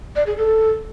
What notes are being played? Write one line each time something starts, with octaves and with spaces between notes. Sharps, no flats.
D5
G#4
A4